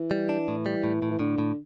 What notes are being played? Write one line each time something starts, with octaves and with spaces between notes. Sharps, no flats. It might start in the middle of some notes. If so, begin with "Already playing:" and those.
Already playing: E3
G3
D4
A2
G3
A2
A2
E3
A2 D3
A2